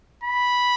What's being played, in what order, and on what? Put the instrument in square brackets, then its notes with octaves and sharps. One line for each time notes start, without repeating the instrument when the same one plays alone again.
[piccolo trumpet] B5